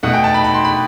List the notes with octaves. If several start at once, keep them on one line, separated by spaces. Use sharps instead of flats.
B2 A3 F#5
G5
A5
B5
B5
C6
B5